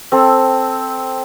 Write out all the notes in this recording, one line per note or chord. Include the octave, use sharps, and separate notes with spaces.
C4 A4